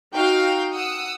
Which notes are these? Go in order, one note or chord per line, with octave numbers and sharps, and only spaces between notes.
D#4 F#4 F5 G5
F#5 D#6 E6